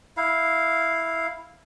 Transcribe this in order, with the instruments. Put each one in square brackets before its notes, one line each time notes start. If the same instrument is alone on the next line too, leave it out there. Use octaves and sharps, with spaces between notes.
[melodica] E4 F5